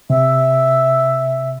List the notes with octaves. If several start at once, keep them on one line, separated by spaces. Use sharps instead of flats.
C3 E5